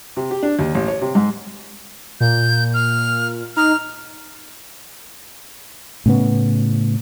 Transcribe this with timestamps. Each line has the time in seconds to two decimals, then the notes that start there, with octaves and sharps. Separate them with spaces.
0.17 C3
0.31 G4
0.43 D4
0.59 D#2
0.75 A1
0.88 C#5
1.02 C3
1.15 G#2
2.20 A#2 G6
2.74 F6
3.56 D#4 F6
6.06 A2 C#3 B3